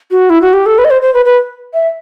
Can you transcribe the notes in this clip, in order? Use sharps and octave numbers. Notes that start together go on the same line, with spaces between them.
F#4
E4
F#4
G4
A4
B4
D#5
C5
C5
B4
B4
E5